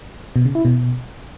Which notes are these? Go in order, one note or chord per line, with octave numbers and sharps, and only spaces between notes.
B2
C#3
E4
B2